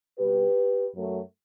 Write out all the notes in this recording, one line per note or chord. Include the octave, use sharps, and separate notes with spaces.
B2 G3 G4 B4
F#2 F#3 A3